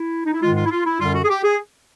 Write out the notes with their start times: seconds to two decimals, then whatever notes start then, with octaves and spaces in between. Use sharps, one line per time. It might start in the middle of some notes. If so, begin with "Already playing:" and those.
Already playing: E4
0.26 D#4
0.34 E4
0.42 G#2 D#3 G#3 F4
0.57 F4
0.66 E4
0.71 F4
0.86 E4
1.00 F#2 D3 G3 F4
1.14 F#4
1.25 G#4
1.29 G4
1.44 G#4